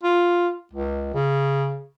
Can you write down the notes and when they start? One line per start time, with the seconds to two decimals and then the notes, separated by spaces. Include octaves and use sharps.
0.03 F4
0.73 C#2
1.14 C#3